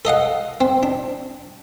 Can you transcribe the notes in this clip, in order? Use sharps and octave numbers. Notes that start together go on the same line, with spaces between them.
A4 D#5 F5 F#5
C4
D4